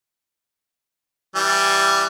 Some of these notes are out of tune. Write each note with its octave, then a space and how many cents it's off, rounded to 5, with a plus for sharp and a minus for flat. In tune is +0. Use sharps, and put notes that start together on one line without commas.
E3 +0 G3 +0